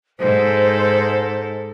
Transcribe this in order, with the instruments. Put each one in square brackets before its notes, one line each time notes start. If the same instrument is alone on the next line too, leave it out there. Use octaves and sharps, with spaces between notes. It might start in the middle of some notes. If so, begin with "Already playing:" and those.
[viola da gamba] G#2 A4 [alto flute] C5